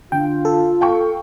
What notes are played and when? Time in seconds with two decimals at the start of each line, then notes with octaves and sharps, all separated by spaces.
0.12 D3 F4 G5
0.45 A4
0.81 F5 G5 C#6